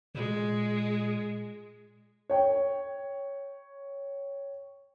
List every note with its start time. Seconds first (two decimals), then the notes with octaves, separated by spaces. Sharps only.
0.15 A#2 G#3
2.30 C#5 G5